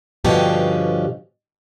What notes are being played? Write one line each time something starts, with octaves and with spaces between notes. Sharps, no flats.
G2 B2 D3 F3 C#4 G4